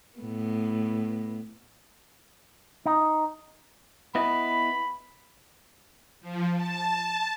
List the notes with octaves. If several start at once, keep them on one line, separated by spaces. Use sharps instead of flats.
A2 B3
D#4
B3 E4 D#5 B5
F3
A5